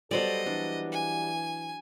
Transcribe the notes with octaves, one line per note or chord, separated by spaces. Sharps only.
F#3 G3 B3 A4 C5 D5 D#5
E3 D4
G#5